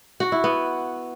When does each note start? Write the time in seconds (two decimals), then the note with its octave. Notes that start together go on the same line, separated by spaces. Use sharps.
0.20 F#4
0.32 E4
0.44 B3